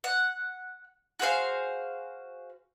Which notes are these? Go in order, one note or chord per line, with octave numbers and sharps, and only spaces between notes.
F#5
F#4 G#4 C5 F5